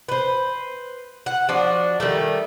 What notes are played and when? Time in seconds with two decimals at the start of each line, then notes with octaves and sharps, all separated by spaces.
0.09 B4 C5
1.26 F#5
1.49 F3 D4 F#4
2.00 D#3 G3 A3